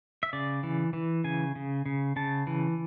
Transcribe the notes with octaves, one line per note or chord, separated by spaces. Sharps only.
E5
C#3 D5
E3
E3
C#3 G#5
C#3
C#3
C#3 A5
E3